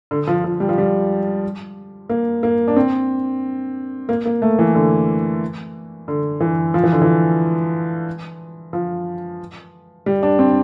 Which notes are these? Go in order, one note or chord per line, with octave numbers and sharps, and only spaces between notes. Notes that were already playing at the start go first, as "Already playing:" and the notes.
D3
F3
F3
G3
F3
G3
A#3
A#3
D4
C4
A#3
A#3
A3
E3
D3
D3
E3
F3
E3
D3
E3
F3
G3
D4
C4